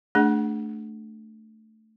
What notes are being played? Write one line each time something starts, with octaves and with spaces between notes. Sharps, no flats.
A3 D4 G#4 F#5